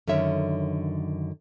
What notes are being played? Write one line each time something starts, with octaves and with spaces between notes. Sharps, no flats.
F#2 D3 D#3 C#5 E5